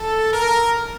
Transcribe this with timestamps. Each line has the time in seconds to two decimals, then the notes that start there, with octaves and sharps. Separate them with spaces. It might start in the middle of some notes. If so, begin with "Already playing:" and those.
Already playing: A4
0.33 A#4